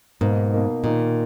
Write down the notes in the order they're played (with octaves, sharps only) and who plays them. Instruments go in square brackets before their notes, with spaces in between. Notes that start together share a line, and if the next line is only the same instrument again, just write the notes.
[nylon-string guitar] G#2 [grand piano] B2 A#3 D#4
[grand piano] B2 A#3 D#4
[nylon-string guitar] A#2 [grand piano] D#3 A#3 D#4